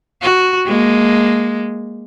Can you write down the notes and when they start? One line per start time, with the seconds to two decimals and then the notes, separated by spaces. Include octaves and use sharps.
0.22 F#4
0.66 G#3 A#3